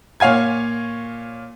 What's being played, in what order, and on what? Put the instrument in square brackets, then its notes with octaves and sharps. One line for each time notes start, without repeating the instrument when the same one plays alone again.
[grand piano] A#2 C#5 F5 G#5 G#6